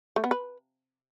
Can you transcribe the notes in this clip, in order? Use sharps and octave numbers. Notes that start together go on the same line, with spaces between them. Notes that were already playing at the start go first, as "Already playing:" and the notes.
A3
B3
B4